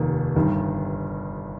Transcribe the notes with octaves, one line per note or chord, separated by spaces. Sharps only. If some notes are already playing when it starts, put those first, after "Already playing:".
Already playing: F1 D#2 D#3 A#3
G1 G2 D#3